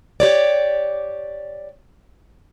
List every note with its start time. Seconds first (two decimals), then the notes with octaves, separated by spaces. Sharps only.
0.20 G4 C#5 D5